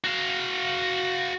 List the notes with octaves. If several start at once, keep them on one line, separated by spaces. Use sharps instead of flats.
F#4 F5